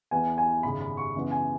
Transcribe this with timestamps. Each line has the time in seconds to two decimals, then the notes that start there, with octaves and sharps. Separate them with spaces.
0.11 E2 E3 B3 G#5
0.38 G#5
0.63 G#1 F#2 C#3 G#3 B5
0.81 B5
0.97 C#6
1.14 F#2 C#3 E3 G#3 B3
1.31 G#5